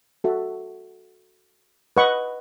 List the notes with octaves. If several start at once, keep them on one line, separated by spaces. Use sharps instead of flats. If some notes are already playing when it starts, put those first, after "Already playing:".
F#4 A4 E5
B4 D#5 F#5 C#6